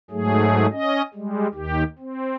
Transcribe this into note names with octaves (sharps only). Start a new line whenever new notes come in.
G#2 F#3 A3 G#4
C#4 D#5
G3 G#3
D#2 D#3 G4
C4